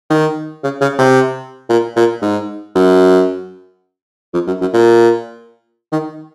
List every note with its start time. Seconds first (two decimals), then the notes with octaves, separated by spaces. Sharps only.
0.10 D#3
0.64 C#3
0.81 C#3
0.99 C3
1.69 A#2
1.97 A#2
2.22 G#2
2.75 F#2
4.34 F2
4.47 F#2
4.61 F#2
4.73 A#2
5.92 D#3